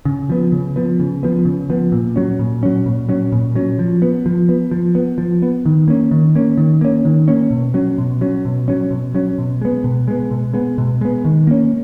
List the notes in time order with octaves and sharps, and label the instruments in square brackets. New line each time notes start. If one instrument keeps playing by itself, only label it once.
[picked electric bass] C#3
F3 B3
C#3
F3 B3
C#3
F3 B3
C#3
F3 B3
A#2
F#3 C#4
A#2
F#3 C#4
A#2
F#3 C#4
A#2
F#3 C#4
F3
B3
F3
B3
F3
B3
F3
B3
D#3
A#3 C#4
D#3
A#3 C#4
D#3
A#3 C#4
D#3
A#3 C#4
B2
F#3 C#4
B2
F#3 C#4
B2
F#3 C#4
B2
F#3 C#4
B2
G#3 B3
B2
G#3 B3
B2
G#3 B3
B2
G#3 B3
D#3
A#3 C#4